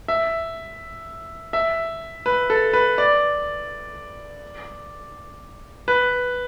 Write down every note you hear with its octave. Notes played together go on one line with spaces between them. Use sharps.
E5
E5
B4
A4
B4
D5
B4